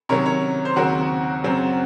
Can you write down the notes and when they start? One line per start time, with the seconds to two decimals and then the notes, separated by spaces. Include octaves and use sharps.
0.09 C3 D#3 F#3 C#4 A#4 C#5
0.26 A#4 C#5
0.65 C5
0.76 D#2 C#3 F#3 C4 F#4 A#4
1.44 F#2 C#3 F#3 C4